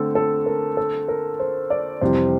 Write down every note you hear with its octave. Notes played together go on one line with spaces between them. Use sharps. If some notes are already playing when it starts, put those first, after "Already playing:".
Already playing: D3 A3 C4 A4
A4
A#4
A4
A#4
C5
D5
F2 C3 E3 G3 C5